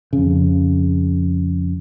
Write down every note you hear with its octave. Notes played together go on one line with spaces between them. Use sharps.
F2 C#3